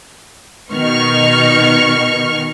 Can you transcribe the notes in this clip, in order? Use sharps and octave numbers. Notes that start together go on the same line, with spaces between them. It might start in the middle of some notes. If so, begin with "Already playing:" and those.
B2 D#3 C#6 F6